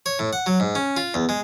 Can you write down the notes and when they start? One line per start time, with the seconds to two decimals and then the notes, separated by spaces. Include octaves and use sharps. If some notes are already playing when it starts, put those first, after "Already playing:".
0.06 C#5
0.19 A2
0.33 F#5
0.46 F#3
0.60 G#2
0.75 C#4
0.97 F4
1.14 E2
1.29 G#3